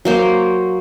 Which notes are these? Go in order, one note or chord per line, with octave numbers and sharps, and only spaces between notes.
F#3 A#3 C5